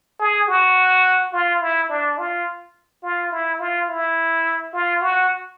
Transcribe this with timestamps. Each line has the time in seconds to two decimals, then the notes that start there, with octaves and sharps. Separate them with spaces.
0.20 G#4
0.48 F#4
1.33 F4
1.61 E4
1.89 D4
2.18 F4
3.03 F4
3.32 E4
3.60 F4
3.88 E4
4.73 F4
5.02 F#4